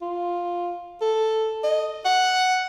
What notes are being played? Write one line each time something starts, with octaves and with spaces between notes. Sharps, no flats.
F4
A4
D#5
F#5